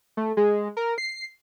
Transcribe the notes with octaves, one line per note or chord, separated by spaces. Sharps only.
A3
G#3
A#4
C7